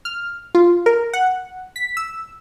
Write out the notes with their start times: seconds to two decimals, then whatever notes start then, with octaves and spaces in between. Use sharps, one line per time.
0.05 F6
0.55 F4
0.86 A#4
1.13 F#5
1.76 B6
1.97 E6